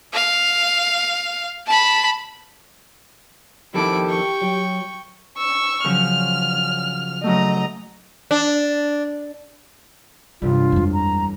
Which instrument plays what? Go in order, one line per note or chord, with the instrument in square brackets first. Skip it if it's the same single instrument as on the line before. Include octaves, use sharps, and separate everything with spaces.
[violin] F5
A5 B5
[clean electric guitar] F2 D#3 A4 [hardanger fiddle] E4 D6 [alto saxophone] G4
[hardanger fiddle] G5 C#6
[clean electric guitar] F#3
[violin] C#6 E6
[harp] C#3 F3 F#3 [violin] F6
[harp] C#3 F#3 A3 [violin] D#5 A#5
[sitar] D4
[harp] A1 G2 G3 [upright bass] C3 [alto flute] F4
[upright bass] F2 G#3
[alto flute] A#5